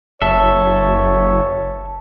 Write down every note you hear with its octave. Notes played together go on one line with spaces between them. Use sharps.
F#1 A4 C#5 E5